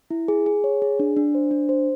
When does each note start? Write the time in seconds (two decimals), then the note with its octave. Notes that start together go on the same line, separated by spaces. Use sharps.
0.11 E4
0.28 G#4
0.46 G#4
0.64 C#5
0.82 G#4
1.00 D4
1.17 D4
1.35 C5
1.51 D4
1.69 C5